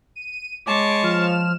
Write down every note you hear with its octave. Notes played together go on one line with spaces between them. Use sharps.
D#7
G#3 C#5 A5 D6
F3 F6 E7